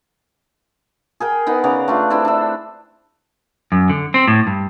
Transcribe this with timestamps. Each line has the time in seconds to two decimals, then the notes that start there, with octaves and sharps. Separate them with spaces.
1.20 G#4 A#4 G5
1.47 B3 D#4 A#4 F#5
1.64 C#3 B4 D5 A#5
1.88 A3 D4 F4
2.10 C4 D4 E4 A4
2.25 D4 E5
3.72 F#2
3.89 D3
4.14 C4
4.28 A2
4.47 G2